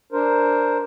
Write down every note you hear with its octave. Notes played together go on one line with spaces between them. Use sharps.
D4 A#4 C5